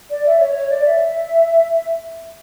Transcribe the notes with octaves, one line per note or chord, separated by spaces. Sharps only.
D5
E5
C#5
C#5
D5
E5